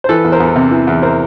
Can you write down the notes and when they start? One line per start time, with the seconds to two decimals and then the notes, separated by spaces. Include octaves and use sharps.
0.04 C5
0.09 E3 A4 B4
0.24 E2
0.32 A#4 C5
0.40 E2
0.56 C3
0.71 E3
0.87 E2
1.02 A#4 C5